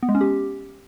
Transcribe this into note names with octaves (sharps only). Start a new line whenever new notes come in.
B3
G#3
C#4
G4